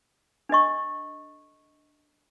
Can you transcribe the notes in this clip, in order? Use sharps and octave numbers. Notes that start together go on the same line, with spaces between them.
D4 A4 D#5 C#6